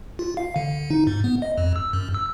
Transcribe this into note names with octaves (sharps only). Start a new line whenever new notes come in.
F4
F5
D3
D#4
G#2
B3
D#5
F2
E6
F#2
E6